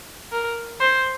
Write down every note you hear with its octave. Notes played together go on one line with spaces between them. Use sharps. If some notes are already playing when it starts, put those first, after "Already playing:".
A#4
C5